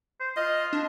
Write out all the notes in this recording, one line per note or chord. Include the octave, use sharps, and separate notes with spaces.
C5
F4 D#5
D4